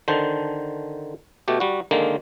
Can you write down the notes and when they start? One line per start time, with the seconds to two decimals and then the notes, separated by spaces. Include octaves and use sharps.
0.08 D3 D#3 C5 A5
1.48 B2 A3 G4
1.60 G3 F#4
1.91 D3 D#3 G#3 A#3